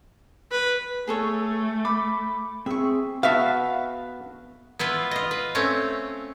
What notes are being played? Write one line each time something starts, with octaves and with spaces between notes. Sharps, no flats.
B4
A3 G#4 A4 C#5
B5 D6
C4 G#4 E5 C#6
B3 F#4 E5 F5 A5
B3 E4 F4 B4
F4 D#5
B4
A3 C4 C#4 C#5